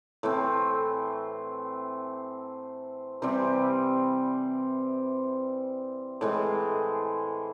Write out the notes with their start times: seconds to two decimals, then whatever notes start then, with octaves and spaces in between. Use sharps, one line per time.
0.23 A2 E3 A3 C4
3.22 C3 E3 G3 C4
6.21 A2 E3 G#3